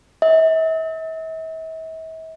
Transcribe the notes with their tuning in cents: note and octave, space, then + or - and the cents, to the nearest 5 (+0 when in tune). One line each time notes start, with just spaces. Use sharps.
E5 -45